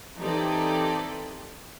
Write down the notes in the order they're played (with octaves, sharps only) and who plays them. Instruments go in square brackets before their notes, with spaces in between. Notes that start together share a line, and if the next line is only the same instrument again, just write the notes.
[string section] E3 C4 D#4 G4 A4 D5